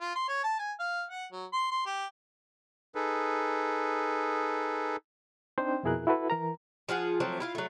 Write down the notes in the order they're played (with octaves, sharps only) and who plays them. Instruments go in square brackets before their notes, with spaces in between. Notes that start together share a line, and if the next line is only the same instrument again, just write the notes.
[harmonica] F4
C6
C#5
A5
G#5
F5
F#5
F#3
C6
C6
G4
[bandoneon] D#4 G#4 A4 B4
[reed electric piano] C4 D4 D#4 C5 G5
F2 B2 E4 G#4 A#4 F#6
E4 F#4 A4 B4
E3 A#4 A#5
[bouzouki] F3 F4 G#4 F#5
F3 F#3 A3 C4
E4 F4 F5
F#3 A3